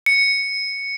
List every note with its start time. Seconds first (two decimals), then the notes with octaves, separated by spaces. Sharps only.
0.06 C#7